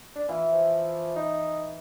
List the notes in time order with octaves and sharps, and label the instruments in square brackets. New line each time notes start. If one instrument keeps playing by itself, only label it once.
[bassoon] D4
[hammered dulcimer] E3 [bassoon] F4
[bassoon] F3
D#4